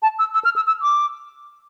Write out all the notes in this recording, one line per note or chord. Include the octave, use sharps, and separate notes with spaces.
A5
E6
E6
F6
E6
E6
D6